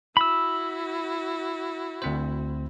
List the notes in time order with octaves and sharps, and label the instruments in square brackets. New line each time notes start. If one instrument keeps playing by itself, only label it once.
[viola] E4 F#4 [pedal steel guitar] B5 E6
[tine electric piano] D2 C4 C5